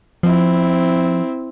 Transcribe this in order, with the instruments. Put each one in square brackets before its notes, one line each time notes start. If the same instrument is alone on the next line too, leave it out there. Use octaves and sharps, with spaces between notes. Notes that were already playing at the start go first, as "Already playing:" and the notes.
[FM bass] F3 [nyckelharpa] C4 E4